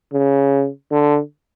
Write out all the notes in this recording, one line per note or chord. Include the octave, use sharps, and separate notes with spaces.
C#3
D3